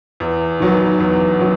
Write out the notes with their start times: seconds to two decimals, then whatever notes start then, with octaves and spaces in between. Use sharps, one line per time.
0.20 E2
0.60 D#3 F#3 B3
1.00 E2
1.39 D#3 F#3 B3